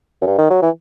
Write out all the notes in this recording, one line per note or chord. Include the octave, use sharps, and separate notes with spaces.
F#2
G2
D#3
F#3
E3